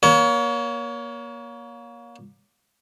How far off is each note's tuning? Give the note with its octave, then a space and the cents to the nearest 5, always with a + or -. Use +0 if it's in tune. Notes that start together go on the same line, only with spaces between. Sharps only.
A#3 +30 C#5 +30